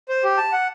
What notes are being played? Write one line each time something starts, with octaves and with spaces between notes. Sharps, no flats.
C5
G4
A5
F#5